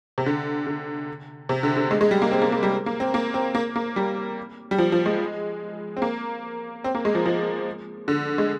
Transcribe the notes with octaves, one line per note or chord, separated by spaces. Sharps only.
C3
D3
D3
C3
D3
D3
G#3
G#3
G3
A#3
C4
A#3
A#3
G3
A#3
C4
A#3
C4
A#3
A#3
G3
G3
F3
F3
G#3
C4
A#3
C4
A#3
G#3
F3
F3
D3
G#3